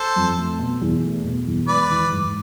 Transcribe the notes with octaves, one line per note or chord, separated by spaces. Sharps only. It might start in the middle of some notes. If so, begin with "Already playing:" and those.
Already playing: A4 C5
F2
A3
B2
E2
A3
B2
E2
G#3 B4 D5
E3
G#2